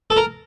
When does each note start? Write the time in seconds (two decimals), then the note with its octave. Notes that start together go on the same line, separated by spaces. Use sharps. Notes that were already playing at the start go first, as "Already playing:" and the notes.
0.10 A4
0.17 A#4